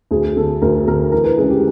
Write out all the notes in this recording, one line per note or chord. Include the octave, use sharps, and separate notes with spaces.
D2 G#4
D3 A4
D2 A#4
D3 A#4
E3 A#4
B4
C#2 G#4
G4